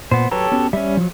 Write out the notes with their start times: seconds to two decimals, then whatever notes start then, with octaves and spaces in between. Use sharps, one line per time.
0.11 A#2 B3 C5
0.31 F#3 G4 A4 B4 C#5 A#5
0.52 B3 C#4 F#4
0.73 G3 C#4 E5
0.97 F3 F#3